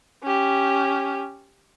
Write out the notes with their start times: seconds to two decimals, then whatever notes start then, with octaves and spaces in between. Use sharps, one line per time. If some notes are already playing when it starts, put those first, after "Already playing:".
0.23 C#4 G4